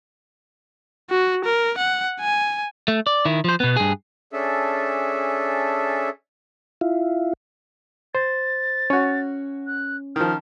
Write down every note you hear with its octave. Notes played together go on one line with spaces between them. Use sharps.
F#4
A#4
F#5
G#5
A3
D5
D#3 E4
F3 C5
B2 B3
G2 G#4
C#4 D4 G#4 A4 E5
E4 F4
C5 A6
C#4 F#4 C#5
F#6
D#3 F3 F6